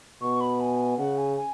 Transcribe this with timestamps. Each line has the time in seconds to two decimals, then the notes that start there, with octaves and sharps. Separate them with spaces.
0.21 B2 C#6
0.41 B5
0.60 G#5
0.98 C#3 F#5
1.18 G#5
1.37 G#5